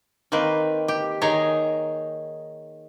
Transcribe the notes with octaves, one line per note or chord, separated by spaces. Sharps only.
D#3 A#3 C4 B4
G4
D#3 D#4 G#4 C#5 A#5